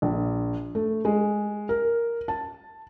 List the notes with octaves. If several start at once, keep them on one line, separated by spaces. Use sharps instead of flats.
A#1
A3
G#3
A#4
A5